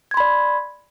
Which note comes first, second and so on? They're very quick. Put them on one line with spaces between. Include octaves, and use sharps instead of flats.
G#6 C6 B5 D5